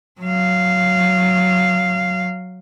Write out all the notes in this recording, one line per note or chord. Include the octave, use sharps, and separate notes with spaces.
F#3 F5